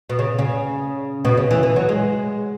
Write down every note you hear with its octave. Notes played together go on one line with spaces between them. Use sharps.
B2
C#3
C#3
B2
C#3
E3
E3
F#3
G#3